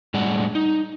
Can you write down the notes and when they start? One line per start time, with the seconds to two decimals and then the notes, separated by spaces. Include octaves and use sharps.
0.14 A2 G3 G#3 D4 F#5
0.55 D#4